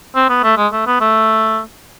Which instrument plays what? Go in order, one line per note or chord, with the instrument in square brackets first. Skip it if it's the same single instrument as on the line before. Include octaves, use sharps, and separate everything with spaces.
[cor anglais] C4
B3
A3
G#3
A3
B3
A3